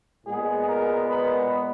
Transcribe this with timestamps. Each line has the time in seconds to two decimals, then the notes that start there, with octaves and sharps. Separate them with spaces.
0.24 A#2 G#3 B3 G#4
0.65 A#4
1.06 B4